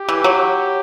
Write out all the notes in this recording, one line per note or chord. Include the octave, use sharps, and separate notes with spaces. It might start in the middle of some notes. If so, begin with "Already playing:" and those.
Already playing: G4
E3
F#3